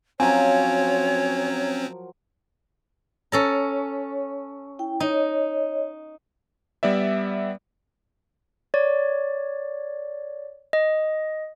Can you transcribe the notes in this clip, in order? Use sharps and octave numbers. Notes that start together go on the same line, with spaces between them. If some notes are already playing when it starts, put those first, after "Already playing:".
F3 F#3 C4 C#4 A#4 C#5 G#5
C#4 A4 C#5 A#5
E4 G5
D#4 C#5 D#5
G3 B3 D5 E5
C#5 D5
D#5